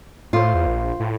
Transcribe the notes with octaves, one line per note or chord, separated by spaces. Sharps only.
A2 F4 C5
E2
A#1
A2